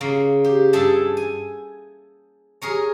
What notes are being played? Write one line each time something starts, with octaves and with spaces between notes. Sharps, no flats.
C#3 A#3
G4
G2 G#4 A4 E5 A5
G#5
G#4 A#4 C#5